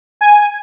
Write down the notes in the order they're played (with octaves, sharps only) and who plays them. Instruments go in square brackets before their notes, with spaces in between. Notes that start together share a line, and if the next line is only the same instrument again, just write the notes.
[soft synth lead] G#5